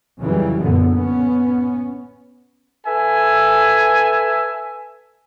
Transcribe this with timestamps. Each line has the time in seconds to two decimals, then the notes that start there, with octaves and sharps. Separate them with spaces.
0.20 F2 C#3 E3 F#3 G3
0.63 F#1 F#2 A#2 D3 B3
0.94 B3 C#4
2.86 A4 B4 E5 G#5